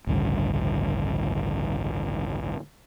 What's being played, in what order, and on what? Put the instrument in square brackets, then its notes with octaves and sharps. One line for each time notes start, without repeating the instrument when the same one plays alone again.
[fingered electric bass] A1 D2 G2 C#3